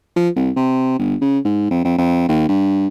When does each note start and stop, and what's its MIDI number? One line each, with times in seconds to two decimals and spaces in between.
0.16 0.29 53
0.36 0.51 36
0.56 0.97 48
0.99 1.15 31
1.21 1.39 49
1.44 1.69 44
1.70 1.81 41
1.84 1.97 41
1.98 2.27 41
2.28 2.47 39
2.49 2.88 43